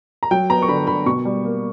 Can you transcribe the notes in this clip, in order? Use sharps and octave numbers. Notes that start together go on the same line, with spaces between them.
A#5
F#3 G5
B3 A#5
C#6
D3 B5
D3 B5
B2 C#6
G3
A#3